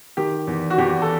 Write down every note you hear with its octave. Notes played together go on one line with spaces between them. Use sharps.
D#3 G4
E2
F#4
E2 G4
A4